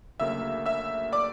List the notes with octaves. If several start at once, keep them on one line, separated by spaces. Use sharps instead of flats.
D2 C#3 F#3 A#3 E5 E6
E5 E6
D5 D6